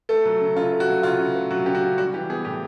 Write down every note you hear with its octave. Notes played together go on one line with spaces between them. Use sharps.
A3 A4
F#3
C#3
C#3 F4
A3
F#4
F#3
C#3 F4
C#3
A3
F#3 F#4
C#3 G4
F#4
C#3
G3 F#4
E3 G4
B3 G#4
A2 G4